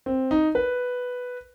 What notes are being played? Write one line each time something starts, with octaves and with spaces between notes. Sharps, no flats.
C4
D#4
B4